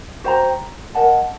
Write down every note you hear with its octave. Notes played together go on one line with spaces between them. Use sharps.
F#4 C5 G5 A#5
A#4 D#5 F#5 A5